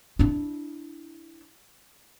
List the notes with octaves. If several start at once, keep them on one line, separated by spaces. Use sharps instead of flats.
D4 E4